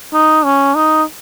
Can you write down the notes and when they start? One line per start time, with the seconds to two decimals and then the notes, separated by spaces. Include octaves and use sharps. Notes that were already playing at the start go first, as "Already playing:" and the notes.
0.14 D#4
0.44 C#4
0.75 D#4